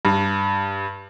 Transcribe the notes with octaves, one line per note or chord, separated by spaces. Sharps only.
G2